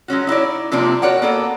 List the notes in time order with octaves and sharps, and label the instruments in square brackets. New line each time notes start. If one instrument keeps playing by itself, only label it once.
[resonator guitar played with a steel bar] F#3 G#3 C#4 F#4
D#4 E4 C#5 D5
C3 F3 G3 A#3 C4 D4
F#4 A#4 C#5 D5 F#5
A#3 B3 A4 D5